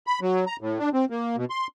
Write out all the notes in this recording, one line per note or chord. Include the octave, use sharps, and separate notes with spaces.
B5
F#3
A#5
A2
D4
C4
A#3
B2
C6